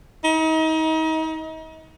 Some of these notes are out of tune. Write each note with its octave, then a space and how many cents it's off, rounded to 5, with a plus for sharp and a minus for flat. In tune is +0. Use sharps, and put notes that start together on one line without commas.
D#4 +35